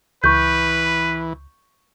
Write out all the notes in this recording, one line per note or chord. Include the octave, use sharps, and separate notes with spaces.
C#2 E3 B4 C#6 G6